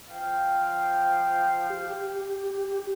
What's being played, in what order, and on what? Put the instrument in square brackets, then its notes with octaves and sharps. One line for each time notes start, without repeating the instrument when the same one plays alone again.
[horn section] F3 F5 G5
[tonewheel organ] G4